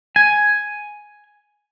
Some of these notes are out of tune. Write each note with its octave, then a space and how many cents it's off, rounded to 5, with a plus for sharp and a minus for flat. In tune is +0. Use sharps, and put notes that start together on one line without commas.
G#5 +5